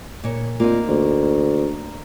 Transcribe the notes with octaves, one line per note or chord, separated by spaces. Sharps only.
A#2 C#5
A#2 A#3 C4 D#4
D2